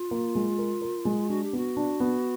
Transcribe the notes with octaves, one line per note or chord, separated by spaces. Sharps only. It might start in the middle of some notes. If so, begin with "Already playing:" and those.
Already playing: F4
A#3
G#3
A#4
A#4
G#3
D4 F#4
G4
B3 F#4
D4
B3